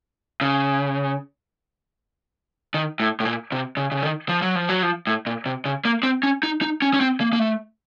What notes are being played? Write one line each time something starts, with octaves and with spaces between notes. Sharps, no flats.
C#3
D#3
A2
A2
A#2
C3
C#3
C#3
D#3
F3
F#3
F3
F#3
F3
A2
A#2
C3
C#3
A#3
C4
C#4
D#4
D#4
C#4
C#4
C4
A#3
A#3
A3